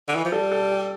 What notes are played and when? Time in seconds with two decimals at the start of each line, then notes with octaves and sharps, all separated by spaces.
0.08 D3
0.16 E3
0.25 F3
0.32 G3 A4
0.52 A4
0.71 G4